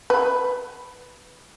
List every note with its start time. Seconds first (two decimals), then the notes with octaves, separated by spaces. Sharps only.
0.10 B4